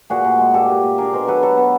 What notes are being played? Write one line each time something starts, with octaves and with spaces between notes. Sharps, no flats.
A#2 F#4 G#4
A#2
G#3
A#2 G4 A4
A#2
A#2
D4 G#4 A#4
B2 A#4 C5
F#3 A4 B4
F#3 A4 B4
B3